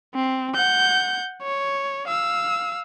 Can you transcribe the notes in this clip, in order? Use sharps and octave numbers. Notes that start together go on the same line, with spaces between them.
C4
F#5 G6
C#5
F5 E6